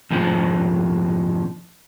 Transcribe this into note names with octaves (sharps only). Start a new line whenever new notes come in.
F2 G#2 C3 F3